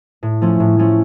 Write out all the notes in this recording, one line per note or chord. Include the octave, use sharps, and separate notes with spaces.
A2
F3 A3 C#4
A2
F3 A3 C#4